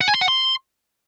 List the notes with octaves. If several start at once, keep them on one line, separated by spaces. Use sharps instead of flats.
F#5
G#5
C6
F#5
C6